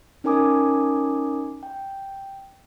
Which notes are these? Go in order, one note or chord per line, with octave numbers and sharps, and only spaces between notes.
C#4 D#4 A#4 G#5 D6 D#6
G5